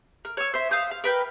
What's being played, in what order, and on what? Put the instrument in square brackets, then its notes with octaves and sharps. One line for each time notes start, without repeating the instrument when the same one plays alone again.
[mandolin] A#4
C#5 E6
C5 E5
F5 D#6 E6 G6
F5
A#4 B4 G5